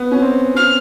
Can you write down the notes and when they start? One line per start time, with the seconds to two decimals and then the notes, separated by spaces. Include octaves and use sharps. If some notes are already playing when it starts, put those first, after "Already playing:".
Already playing: B3
0.11 C#4
0.22 C4
0.55 C#4 F6